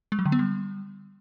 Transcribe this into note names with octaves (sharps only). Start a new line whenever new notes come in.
G#3
F#3
D3
B3
G3